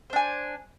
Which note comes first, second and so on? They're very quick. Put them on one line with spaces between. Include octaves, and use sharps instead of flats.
C5 D4 G#5